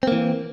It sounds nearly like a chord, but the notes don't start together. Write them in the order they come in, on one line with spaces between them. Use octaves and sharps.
C4 A#3 E3